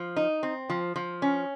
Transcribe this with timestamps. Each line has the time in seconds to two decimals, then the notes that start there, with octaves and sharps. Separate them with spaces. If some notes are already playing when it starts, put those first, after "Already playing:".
Already playing: F3
0.16 D#4
0.43 C4
0.70 F3
0.96 F3
1.22 C#4